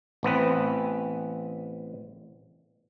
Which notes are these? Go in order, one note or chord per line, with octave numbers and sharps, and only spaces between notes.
A1 B3 C4 B4